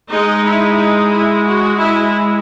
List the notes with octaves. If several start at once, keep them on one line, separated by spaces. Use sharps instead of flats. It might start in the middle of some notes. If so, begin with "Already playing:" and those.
G#3 D#4 D#5
E4
D#4
E4
F#4
E4